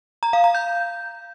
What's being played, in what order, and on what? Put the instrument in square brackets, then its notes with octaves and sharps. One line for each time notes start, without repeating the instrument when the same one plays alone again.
[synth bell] A#5
F5
A#5
G6